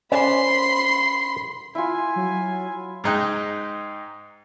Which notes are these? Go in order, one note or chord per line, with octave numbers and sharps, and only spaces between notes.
C#4 C5 D5 B5 C6
E4 F4 G#5
F#3
G#2 G#3 D#4 G5 F#6